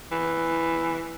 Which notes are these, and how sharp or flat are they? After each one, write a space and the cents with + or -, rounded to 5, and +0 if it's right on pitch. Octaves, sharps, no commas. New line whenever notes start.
E3 +5